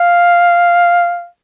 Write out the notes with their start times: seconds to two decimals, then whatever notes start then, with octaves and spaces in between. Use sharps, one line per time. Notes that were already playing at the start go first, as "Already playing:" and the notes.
Already playing: F5